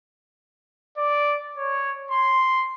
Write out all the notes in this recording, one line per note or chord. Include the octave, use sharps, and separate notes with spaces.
D5
C#5
C6